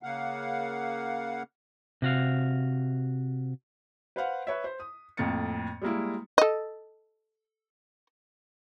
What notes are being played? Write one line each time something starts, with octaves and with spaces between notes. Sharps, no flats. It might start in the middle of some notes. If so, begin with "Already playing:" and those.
C#3 A#3 F5 F#5
C3 F#4 F5
B4 C5 F5 F#5
B4 C#5 E5
C5
D#6
F2 A2 A#3 A6 C#7
G3 G#3 A#3 E4
A4 D#5